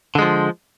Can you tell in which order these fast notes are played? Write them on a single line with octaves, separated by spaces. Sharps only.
D3 G#3 F3